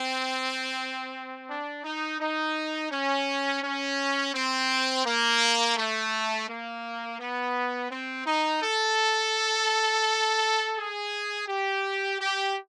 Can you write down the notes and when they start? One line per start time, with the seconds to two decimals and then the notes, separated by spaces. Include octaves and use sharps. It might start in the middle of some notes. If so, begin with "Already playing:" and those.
Already playing: C4
1.49 D4
1.84 D#4
2.20 D#4
2.91 C#4
3.63 C#4
4.34 C4
5.05 A#3
5.77 A3
6.48 A#3
7.20 B3
7.91 C4
8.26 D#4
8.63 A4
10.77 G#4
11.48 G4
12.20 G4